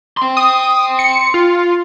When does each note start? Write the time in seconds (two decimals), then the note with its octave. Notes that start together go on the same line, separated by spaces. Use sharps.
0.17 G5 C6
0.37 D#6
0.99 C#7
1.34 F4